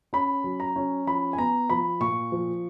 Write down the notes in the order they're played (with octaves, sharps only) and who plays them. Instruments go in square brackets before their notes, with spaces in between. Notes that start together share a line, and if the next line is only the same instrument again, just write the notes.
[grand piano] C#4 B5
F#3
A#5
C#4
F3 B5
G#5
B3 A#5
F3 B5
A#2 C#6
F3